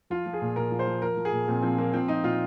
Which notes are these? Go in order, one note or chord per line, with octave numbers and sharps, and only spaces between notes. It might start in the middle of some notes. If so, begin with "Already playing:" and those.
F3 F4
F3
G#4
A#2
A#2 A#4
F3
C5
F3
F3 A#4
F3
G#4
A#2
A#2 C4
F3 C4
F3 A#3
F3 C4
F3 D#4
A#2 F4